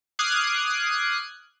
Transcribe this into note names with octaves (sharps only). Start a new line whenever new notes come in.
D6 D#6 F6 F#6 G#6 C7